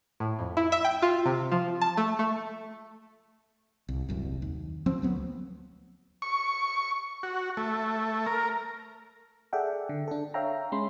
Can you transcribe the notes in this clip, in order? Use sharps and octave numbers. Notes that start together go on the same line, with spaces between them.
A2
F2
E4
E5
G5
F4
C3
F3
A5
A3
A3
C2
D#1 C2 F#2
D#2
F3 C4 C#4
D2 F#3 B3
C#6
F#4
A3
A#4
G#4 A4 D5 E5 F#5 G5
D3
D4 A4
C#5 E5 F5 G5 A#5
G#3 C#4 B5 C6